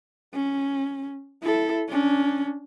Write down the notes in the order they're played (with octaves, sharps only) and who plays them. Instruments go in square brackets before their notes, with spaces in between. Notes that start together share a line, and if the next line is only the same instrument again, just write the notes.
[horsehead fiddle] C#4
E4 A4
C#4 D4